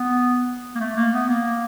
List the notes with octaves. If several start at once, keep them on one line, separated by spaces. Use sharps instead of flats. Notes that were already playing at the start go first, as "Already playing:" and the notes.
Already playing: B3
A#3
A3
A#3
B3
A#3